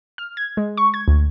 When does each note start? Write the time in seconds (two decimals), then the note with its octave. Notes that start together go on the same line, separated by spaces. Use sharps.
0.18 F6
0.37 G#6
0.57 G#3
0.77 C#6
0.94 G#6
1.08 D2